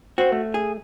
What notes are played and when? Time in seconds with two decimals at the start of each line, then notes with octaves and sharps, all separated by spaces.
0.18 C4 F#4 C5
0.32 A3
0.54 G#4